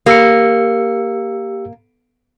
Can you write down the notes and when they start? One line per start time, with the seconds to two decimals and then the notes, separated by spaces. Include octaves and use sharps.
0.06 A#3 G4 E6 C#7